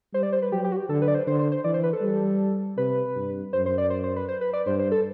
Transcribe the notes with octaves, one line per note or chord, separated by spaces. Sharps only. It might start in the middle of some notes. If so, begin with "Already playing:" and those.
G3 C5
D5
C5
B4
F#3 G4
G4
F#4
G4
D3 A4
B4
D5
C5
D3 C5
C5
C5
E3 D5
C5
B4
A4
G3
C3 B4
G2
F#2 C5
C5
D5
C5
C5
B4
C5
B4
D5
G2 C5
C5
A4